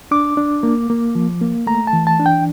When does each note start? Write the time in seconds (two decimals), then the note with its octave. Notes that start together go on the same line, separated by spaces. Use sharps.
0.11 D4 D6
0.37 D4
0.63 A#3
0.90 A#3
1.15 F3
1.41 A#3
1.67 A3 A#5
1.87 A5
1.93 E3
2.07 A5
2.20 D4
2.26 G5